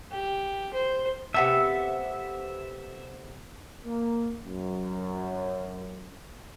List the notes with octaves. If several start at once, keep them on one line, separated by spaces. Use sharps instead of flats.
G4
C5
C3 B3 A4 E5
A#3
F#2